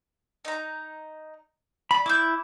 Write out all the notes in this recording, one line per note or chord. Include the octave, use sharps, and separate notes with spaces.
D#4 A#5
D5 B5
E4 D6 D#6 G6